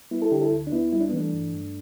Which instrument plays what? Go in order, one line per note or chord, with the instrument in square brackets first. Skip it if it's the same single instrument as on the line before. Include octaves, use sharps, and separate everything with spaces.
[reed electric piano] G3 B3 E4
E4 A4
D3 D4 G4
E4 A4
D2
D4
D2 B3 E4
G3 E4
D4
B3
E3 A3 D4
G2
G2